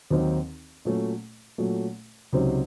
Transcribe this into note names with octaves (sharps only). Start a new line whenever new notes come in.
D#2 D#3 F#3 C4 D#4
A#2 F#3 A3 C#4
A#2 F#3 A3 C#4
C#2 C3 F#3 C4 D#4